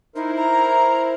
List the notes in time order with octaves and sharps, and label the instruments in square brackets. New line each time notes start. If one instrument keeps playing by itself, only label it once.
[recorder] D#4 [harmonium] E4 A#4 C5
[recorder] A#5